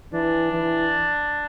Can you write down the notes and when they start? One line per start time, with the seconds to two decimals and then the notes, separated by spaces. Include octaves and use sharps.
0.13 E3 D4
0.53 E3